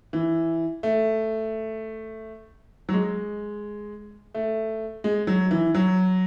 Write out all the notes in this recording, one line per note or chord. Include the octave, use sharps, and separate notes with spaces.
E3
A3
F#3
G#3
A3
G#3
F#3
E3
F#3